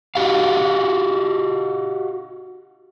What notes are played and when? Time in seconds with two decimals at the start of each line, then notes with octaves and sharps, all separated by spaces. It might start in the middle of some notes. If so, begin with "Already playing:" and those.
0.15 D#4 F#4 G4 F5